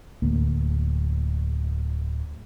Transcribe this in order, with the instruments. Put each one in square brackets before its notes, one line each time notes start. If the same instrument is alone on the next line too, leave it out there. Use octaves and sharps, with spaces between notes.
[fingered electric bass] D1 D2 A#3